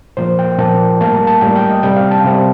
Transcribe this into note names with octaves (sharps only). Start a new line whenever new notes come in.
A#2 F3 A#3 C5
G5
A#2 F3 A#3 A5
A2 G3 A#3 A5
A#5
A5
A2 G3 A#3 G5
G5
D#5
C3 G3 C4 G5
F5
A5
C3 G3 C4